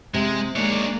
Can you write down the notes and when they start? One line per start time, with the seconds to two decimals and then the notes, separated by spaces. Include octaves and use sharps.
0.14 C3 G#3
0.56 G#3 A#3 D4 D#4 C#5